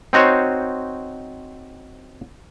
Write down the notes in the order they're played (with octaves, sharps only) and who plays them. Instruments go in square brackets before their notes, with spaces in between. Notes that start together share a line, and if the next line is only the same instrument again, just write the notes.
[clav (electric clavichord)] C4 D#4 F#4 C5 C#5